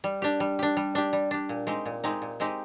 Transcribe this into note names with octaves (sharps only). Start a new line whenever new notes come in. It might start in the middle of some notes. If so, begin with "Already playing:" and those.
G3
D4 G4
G3
D4 G4
G3
D4 G4
G3
D4 G4
A#2
G#3 C4 D#4 G4
A#2
G#3 C4 D#4 G4
A#2
G#3 C4 D#4 G4